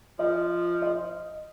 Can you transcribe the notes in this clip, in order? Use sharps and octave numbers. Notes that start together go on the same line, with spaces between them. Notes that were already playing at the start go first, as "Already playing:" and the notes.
F3 D#5
D#5